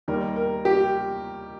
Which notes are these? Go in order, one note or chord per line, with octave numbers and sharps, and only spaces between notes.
D#2 D#3 G3 A#4
A#4
G4